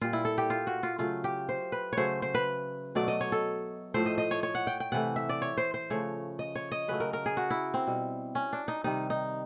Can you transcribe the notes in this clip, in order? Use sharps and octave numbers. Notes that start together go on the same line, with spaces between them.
A#2 G3 F4
E4
A4
G4
F4
F#4
F4
C#3 F#3 A3 F4
G4
C5
B4
C#3 F#3 A3 C5 C#5
C5
B4
B2 F#3 A3 D5
D#5
C#5
A4
A2 F3 A3 C5
D#5
D#5
C#5
C#5
F#5
G5
G5
C3 E3 A3 F#5
E5
D5
C#5
C5
C5
C#3 F3 A3 C#5
D#5
C#5
D#5
C#3 F#3 A3 B4
A#4
A#4
G#4
F#4
E4
C4
B2 G3
C#4
D4
D#4
C3 D#3 G3 D#4
D#4